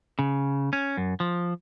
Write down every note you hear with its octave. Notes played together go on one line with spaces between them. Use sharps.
C#3
C#4
F#2
F3